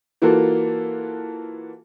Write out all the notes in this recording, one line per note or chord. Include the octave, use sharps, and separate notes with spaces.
E3 A#3 F4 F#4 A4